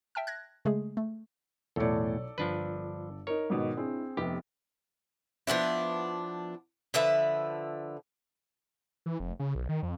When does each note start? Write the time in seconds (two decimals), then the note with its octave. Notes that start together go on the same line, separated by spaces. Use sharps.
0.15 E5 G5 A5 F6
0.27 F#6 G#6 A#6
0.65 C#3 G#3 A3 G#4
0.97 A3
1.76 B1 E2 A2 A4 C#5 D5 C#7
2.38 G1 F3 D4 B4
3.27 D#4 A#4 C#5
3.50 G#2 B2 D#3 D6
3.77 C4 D4 E4 G#4
4.17 F1 B3 G4 E5
5.47 F3 B3 D4 E4
6.94 D3 F3 B4 E5
9.06 E3
9.20 F1
9.40 C#3
9.55 B1
9.69 D#3
9.83 F2